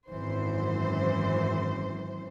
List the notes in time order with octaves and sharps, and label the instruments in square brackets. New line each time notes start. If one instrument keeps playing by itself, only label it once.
[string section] G#1 F#2 E3 C5